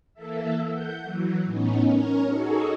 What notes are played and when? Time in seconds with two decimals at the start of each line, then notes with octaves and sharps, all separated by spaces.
0.14 E3 A#3 A4 E5
0.68 F#5 G6
1.02 E3 F#3
1.44 A2 B3 C#4 D#4
1.83 C#4 A#4 C#5
2.24 D#4 F#4 G#4 A4 C#6